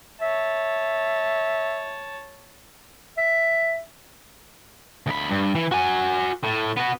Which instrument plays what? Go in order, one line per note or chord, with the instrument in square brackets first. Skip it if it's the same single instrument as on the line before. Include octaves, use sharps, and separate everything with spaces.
[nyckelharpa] C#5 A5 [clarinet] E5
[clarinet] E5
[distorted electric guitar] D2 B5
G2
E3
F#4 G#5
A2
B3 F#4